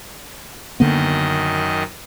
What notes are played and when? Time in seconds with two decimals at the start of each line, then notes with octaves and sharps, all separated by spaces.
0.80 F#2 D3 D#3 A#3 B3 D#5